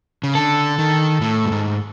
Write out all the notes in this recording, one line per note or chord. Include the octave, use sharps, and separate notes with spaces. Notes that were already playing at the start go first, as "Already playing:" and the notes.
C#3
D3 A4
D#3
A2
G2
G#2